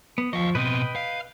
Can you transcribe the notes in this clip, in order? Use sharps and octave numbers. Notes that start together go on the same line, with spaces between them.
B3
F3 D#5 F5 C#6
B2 C4 B4 D#5 G5
F5